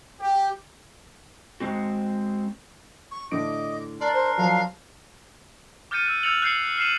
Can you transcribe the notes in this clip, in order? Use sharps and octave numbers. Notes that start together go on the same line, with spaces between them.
G4
G#3 C4 F#4
C#6
A2 D3 D#5 D6 D7
D4 A#4 D5 C6
C5
F3 F#3 F5
D6 F6 G6 A6 C#7 D#7
E6 F#6
E6 G6 A6 C#7 F7 F#7
F#6 G6 C7 C#7 F#7
F6 C7 D#7 E7 F#7